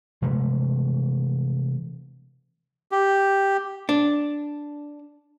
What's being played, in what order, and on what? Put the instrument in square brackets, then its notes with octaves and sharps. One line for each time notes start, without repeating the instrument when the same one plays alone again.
[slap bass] C3 E3 G#3 A3
[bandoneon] G4
[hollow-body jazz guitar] D4